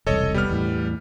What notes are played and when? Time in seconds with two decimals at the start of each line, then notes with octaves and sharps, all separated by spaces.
0.07 E1 C2 A4 C#5 D#5
0.34 G3 B3 F6
0.50 E2 A2